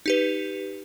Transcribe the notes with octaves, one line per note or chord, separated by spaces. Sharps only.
D#4 G4 B4